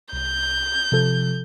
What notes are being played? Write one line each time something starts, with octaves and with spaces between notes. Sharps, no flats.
C2 G6
C3 F3 A4